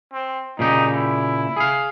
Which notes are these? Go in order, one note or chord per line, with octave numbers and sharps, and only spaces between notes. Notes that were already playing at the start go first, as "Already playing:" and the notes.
C4
A#2 C#3 D#4 G4
E4
G#4 F5